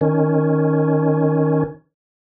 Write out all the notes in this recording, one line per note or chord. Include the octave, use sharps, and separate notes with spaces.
D#3 C#4